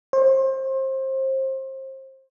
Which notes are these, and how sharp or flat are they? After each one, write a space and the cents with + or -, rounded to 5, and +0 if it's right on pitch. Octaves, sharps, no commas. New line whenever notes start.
C5 +30